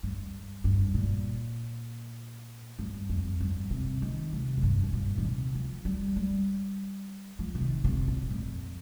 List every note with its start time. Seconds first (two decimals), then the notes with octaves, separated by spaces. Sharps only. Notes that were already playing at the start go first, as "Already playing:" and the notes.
0.03 G2
0.64 G2
0.94 A#2
2.79 G2
3.09 F2
3.40 G2
3.71 C3
4.02 D#3
4.33 C3
4.57 F2
4.63 G2
4.83 C3
4.93 A#2
5.18 D#3
5.24 C3
5.55 F3
5.85 G3
6.16 G3
7.39 F3
7.55 C3
7.61 D#3
7.84 C3
8.08 A#2
8.30 F2